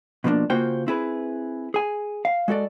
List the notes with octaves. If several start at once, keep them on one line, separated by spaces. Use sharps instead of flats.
B2 F3 A#3 D4
C#3 A#3 F4 F#4 C5 G5
C4 E4 G#4 B4
G#4 G#5
F5
G#3 F#4 A4 D5